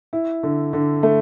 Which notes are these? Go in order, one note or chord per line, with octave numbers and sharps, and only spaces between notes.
E4
D3
D3
A3